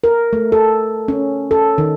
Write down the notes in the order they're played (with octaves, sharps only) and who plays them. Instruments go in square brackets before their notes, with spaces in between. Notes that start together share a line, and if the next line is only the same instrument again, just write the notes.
[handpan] A#4
A3
A4
C#4
A4
D#3